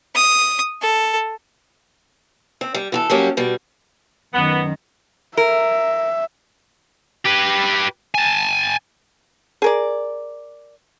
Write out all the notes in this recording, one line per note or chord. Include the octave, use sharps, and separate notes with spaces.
D#6
A4
C4
G3
E3 F#4 A4
F#3 G3 A#3 C#4 G4
B2 G3
F#2 D#3 B3
A#4 E5
G4 B4
G#5 A5
G#4 A#4 D5